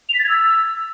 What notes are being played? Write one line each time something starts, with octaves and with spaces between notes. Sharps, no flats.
F7
B6
A6
G#6
E6